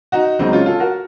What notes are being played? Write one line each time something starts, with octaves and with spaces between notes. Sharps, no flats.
D#4 F#4
C#2 C#3 F#3 C4 D#4
C#4 F4
F4 A4
F#4 A#4